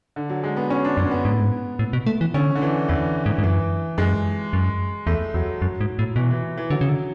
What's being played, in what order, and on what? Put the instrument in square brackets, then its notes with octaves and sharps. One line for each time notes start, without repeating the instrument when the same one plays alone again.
[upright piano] D3
F#3
G#3
B3
C#4
D4
[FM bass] F#2 [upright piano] C#4
[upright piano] B3
[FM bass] G#2
A2
G#2
A2
B2
A3
E3
[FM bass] D3 [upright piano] C#4
[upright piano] D3
E3
[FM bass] E2 [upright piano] E3
[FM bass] G#2
G#2
[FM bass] F#2 [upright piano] E3
[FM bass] F#2 [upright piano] G#3
[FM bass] F#2
[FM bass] E2 [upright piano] A3
[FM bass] E2 [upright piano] F#3
[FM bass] F#2
G#2
A2
[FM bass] B2 [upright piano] E3
[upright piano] E3
E3
[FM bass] D3 [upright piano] F#3
[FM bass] C#3
D3